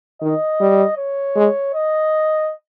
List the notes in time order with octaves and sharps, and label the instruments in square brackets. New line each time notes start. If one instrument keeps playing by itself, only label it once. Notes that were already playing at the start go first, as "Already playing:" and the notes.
[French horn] D#3 [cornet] D#5
[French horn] G3
[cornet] C#5
[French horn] G#3
[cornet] D#5